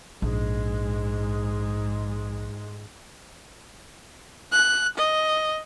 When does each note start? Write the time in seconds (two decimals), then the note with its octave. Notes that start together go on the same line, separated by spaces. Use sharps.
0.22 A#1 G#2 G#3
4.52 F#6
4.98 D#5